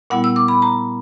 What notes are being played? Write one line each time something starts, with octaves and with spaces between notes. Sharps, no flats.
A#2 G3 B3 E4 F#5
E6
D6
B5
A#5